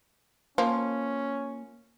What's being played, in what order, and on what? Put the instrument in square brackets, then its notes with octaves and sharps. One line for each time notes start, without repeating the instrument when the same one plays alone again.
[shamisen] F3 [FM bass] A#3 [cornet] C#4